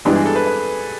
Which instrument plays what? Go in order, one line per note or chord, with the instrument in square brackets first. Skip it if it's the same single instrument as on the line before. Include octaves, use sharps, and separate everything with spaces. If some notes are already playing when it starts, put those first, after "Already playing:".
[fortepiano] G2 E3 G#3 B3 D4 [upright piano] G4
[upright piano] G#4
A4
B4
B4